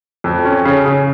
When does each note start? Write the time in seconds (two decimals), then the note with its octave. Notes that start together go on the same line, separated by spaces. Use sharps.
0.24 F2
0.45 C#4
0.65 C#3
0.85 C#3